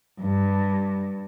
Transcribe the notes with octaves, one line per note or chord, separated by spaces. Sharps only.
G2